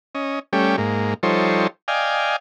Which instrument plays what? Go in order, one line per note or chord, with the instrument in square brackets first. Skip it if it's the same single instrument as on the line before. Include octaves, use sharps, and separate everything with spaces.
[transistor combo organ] C#4 D#5
G3 A3 C#4 G4
G#2 A#3
F3 G3 D#4 A4 C5 C#5
D5 D#5 F5 G5 G#5